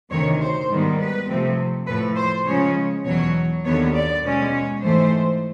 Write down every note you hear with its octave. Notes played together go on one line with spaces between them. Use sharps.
D2 C3 D#3 C#5
C5
G#2 D#3 G3 B3
B4
C3 F3 A3 C4
A2 F3 A3 B4
C5
C#3 F3 G#3 C#4 C#5
E2 B2 F#3 C#5
D#2 D3 F#3 B3 C#5
D5
B2 G#3 C#4
C#5
G#2 E3 A3 C5